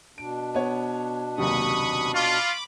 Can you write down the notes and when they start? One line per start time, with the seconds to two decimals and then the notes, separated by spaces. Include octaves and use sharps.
0.18 B2 D4 D7
0.54 B3 C#5
1.38 F#1 D#2 C3 B5 C#6 D#6
2.15 F4 B5 C#6 D6